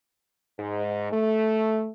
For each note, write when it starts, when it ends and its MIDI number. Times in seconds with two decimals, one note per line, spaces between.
0.59 1.09 44
1.12 1.89 57